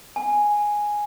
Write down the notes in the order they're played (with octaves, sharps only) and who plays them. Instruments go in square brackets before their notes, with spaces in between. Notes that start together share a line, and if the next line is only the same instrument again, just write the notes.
[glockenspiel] G#5